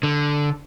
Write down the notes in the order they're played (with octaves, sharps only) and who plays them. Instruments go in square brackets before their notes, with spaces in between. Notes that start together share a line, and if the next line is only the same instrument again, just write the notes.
[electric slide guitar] D3